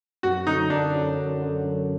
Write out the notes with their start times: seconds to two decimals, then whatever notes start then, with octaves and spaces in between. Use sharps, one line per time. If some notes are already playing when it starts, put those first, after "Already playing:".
0.23 F#2 F#4
0.47 D3 D#4
0.52 F#3
0.70 F#2 D4
0.94 D3 F#3
1.17 F#2
1.42 D3 F#3
1.65 F#2